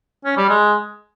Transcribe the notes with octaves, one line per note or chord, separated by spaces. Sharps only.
C#4
G3
G#3